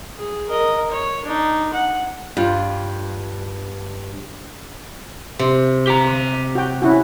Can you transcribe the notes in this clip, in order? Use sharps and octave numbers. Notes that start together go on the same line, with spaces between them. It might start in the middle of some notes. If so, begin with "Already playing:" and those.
G#4
A#4 D#5
C#5
D4 D#4
F#5
G2 F4
C3
G4 A#5
F#4 G5
C#4 E4 F#4